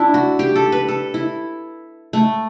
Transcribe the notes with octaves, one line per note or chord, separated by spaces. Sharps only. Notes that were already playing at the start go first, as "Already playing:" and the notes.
Already playing: D4 E4
F#4
G4
A4
B4
A4
E4
A3